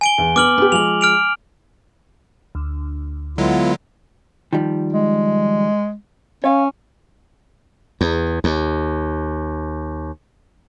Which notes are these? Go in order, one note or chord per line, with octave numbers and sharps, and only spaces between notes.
G#5 D7 G7
E2
B3 D6 F6 F#7
B3 G4
F3 G#3 F7 F#7
F6 D7 F7
D2
D3 F#3 G#3 B3 E4 F4
D#3 F3 G3
G#3
C#4 C#5 F5
E2
D#2